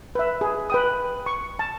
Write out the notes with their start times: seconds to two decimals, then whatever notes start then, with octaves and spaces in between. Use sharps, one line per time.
0.15 B4 E5
0.41 G#4
0.70 B4 G5 D#6
1.26 C#6
1.59 A5